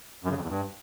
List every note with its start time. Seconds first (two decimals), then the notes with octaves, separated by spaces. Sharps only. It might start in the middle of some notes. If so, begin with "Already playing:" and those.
0.24 F#2
0.31 C#3
0.37 F2
0.43 E2
0.49 G2